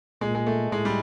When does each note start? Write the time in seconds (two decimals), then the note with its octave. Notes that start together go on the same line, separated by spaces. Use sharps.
0.21 A#2 G#3
0.35 G#3
0.47 A3
0.72 A2 G#3
0.85 G3